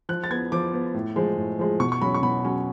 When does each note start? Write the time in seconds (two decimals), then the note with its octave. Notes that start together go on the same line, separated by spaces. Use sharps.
0.09 F3 F#6
0.24 A6
0.30 B3 G#6
0.52 F3 D6
0.73 B3
0.94 A2
1.16 F3 G#3
1.38 A2
1.59 F3 G#3
1.80 B2 C#6
1.92 C#6
2.01 F#3 C#4 B5
2.14 C#6
2.23 B2 B5
2.45 F#3 C#4